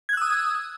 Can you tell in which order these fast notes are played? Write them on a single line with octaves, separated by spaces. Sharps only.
G#6 F#6 E6 D#6